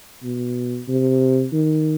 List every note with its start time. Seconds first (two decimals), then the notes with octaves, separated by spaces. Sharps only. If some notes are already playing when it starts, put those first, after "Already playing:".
0.23 B2
0.88 C3
1.53 D#3